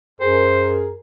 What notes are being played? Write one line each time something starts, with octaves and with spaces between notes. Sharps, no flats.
F#2 G#4 A#4 C5